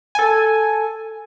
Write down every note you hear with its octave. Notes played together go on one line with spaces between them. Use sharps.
A4 G#5